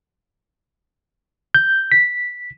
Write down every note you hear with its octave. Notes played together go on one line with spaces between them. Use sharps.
G6
B6